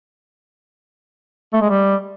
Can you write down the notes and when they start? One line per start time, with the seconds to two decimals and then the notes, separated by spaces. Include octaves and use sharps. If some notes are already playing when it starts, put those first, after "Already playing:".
1.53 A3
1.61 G#3
1.70 G3